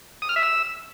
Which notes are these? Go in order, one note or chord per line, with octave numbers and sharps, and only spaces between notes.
D#6
F6
E5
E6